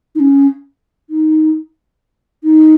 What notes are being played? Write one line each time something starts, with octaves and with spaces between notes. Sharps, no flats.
D#4
C#4
D#4
D#4